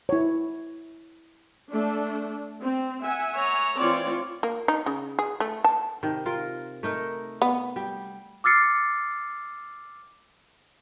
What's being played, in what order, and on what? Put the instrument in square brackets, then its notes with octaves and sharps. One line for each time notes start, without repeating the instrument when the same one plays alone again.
[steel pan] E4 C#5
[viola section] A3 D4
C4
E5 F#5 G#5
[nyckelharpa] C#5 A#5
[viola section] E3 F4 C#5 [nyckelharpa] C4 D5
[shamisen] A#3
D#4
C#3
G#4
A3
A5
[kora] C3 D#3
F4 A#4
A3 D#4 A#4
[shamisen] B3
[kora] G3
[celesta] D6 E6 F6 A6 C7 C#7